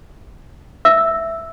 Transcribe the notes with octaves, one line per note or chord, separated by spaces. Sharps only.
E5 E6